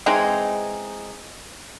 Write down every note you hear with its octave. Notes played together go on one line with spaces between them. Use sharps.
E3 G#3 C4 D#4